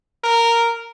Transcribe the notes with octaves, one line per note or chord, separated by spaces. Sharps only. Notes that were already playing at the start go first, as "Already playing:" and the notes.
A#4